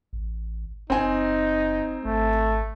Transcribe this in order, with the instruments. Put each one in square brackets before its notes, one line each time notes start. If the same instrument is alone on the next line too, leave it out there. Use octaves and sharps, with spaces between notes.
[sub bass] A1
[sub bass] F#1 [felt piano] C4 G#5 [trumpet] D#4
[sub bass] G#1 [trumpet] A3